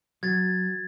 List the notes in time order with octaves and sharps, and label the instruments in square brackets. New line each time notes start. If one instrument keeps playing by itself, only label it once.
[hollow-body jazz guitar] F#3 [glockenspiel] G#6 A6